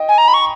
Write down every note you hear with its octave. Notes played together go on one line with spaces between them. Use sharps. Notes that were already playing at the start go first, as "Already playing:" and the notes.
Already playing: D#5 G5
G#5
A#5
B5
C#6